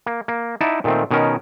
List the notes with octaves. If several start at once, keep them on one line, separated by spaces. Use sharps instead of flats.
A#3
A#3
D#4 E4 D5 E5 F#5 A5
A#2 D#3 A3 C4
B2 D#3 C#4 A#4